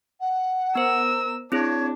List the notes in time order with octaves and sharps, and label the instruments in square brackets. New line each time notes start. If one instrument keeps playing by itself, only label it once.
[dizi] F#5
[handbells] B3 C5 [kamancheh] A#4 E6
[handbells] C4 E4 G#4 [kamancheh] D4 [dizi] C#5